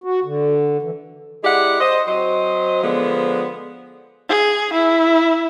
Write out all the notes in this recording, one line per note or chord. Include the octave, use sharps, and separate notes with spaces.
F#4
D3
E3
G#3 E4 G4 D5 F#5
C5 D#5
F#3 C4 C5 D#5
D3 F3 G#3 B3
G#4
E4